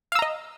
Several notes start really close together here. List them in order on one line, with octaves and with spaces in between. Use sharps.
F5 E6 A#5 D#5